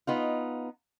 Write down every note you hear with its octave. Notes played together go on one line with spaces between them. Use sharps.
B3 D#4 F4